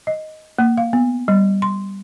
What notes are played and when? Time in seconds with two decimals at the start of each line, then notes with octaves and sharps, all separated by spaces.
0.07 D#5
0.59 A#3
0.78 F5
0.93 B3
1.28 G3
1.62 C6